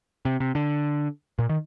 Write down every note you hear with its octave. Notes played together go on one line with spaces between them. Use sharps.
C3
C3
D3
A#2
D#3